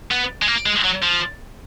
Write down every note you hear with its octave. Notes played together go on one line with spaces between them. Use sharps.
B3
G#3
A#3
G#3
F#3
F3